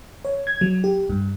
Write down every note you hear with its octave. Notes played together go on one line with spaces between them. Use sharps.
C#5
G#6
F#3
G4
G2